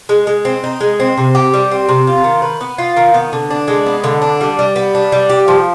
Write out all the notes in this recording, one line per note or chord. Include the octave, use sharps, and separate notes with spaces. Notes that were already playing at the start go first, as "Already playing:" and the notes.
G#3
G#3
C4
D#4
G#3
C4
C3
G4
G3
C4
C3
F4
D#3
B4
B3
F4
D#3
B3
D3
D4
G#3
B3
D3
D4
G3
G3
B3
D4
G3
G4
F3